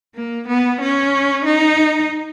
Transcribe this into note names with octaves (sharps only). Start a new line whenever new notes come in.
A#3
B3
C#4
D#4